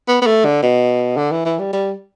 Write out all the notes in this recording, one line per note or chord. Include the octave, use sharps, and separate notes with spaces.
B3
B3
A3
D3
B2
D3
E3
E3
G3
G3